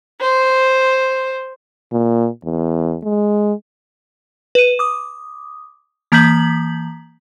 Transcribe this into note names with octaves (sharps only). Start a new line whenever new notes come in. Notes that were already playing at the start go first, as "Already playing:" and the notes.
C5
A#2
E2
G#3
B4 D#7
D6 D#6
E3 A#3 A#5 G6 B6 F#7